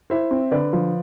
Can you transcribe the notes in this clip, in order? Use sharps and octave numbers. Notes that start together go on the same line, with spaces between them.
E4 C5 E5
C4
D3 B4 D5
F3